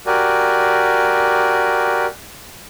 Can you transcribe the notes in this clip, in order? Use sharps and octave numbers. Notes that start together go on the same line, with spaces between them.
F#4 G4 A#4 D5 G#5